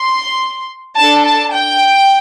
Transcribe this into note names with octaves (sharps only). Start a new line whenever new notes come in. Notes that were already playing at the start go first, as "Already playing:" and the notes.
Already playing: C6
D4 A4 A5
A5
G5